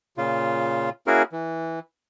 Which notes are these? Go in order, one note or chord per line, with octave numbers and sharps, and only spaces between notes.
A#2 C#3 F4
A#3 C#4 E4 F#4 G#4 A#4
E3